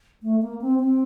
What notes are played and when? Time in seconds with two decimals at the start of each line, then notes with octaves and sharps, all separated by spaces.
0.23 A3
0.42 A#3
0.61 C4
0.80 C4